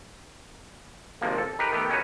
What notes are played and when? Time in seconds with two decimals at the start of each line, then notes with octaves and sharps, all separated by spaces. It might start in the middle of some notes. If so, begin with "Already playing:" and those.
1.21 G#1 C3 F3 A#3
1.38 A4
1.59 D#4 G4 A#4 B4
1.72 D#3 A3 B3 G4
1.90 C#4 D#4 F#4 B4 C#5